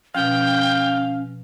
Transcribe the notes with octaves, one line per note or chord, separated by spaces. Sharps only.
B2 F3 C#4 F5 G5